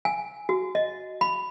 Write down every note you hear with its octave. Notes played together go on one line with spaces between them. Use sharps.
G#5
F#4
D#5
B5